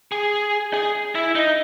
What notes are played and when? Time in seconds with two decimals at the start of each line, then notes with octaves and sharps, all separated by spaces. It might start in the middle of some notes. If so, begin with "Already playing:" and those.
0.12 G#4
0.74 G#4
1.15 E4
1.35 D#4